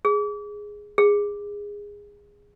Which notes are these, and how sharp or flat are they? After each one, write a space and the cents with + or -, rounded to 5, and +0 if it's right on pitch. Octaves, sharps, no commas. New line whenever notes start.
G#4 +0
G#4 -20